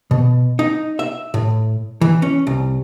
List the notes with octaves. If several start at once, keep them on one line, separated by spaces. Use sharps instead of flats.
B2
D#4
E5
A2
E3
C#4
C2